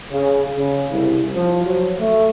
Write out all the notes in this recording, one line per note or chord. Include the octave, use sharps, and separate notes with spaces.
C#3
C#3
C2
F3
F#3
A3